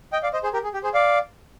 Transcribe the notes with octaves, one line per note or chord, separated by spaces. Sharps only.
D#5 G5
D5 F5
C5 D#5
G#4 C5
G4 A#4
G#4
G4
G#4 C5
D5 F5